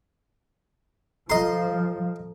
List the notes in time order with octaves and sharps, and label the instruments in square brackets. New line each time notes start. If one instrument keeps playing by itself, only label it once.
[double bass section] F3 [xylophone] A4 A#5 [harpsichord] D#5 C6